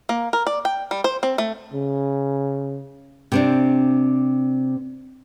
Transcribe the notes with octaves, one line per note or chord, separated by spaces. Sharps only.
A#3
A#4
D5
G5
G3
C5
C4
A3
C#3
C3 C4 D4